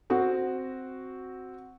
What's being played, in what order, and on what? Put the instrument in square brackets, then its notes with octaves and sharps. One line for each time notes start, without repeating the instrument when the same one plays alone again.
[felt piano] C4 F#4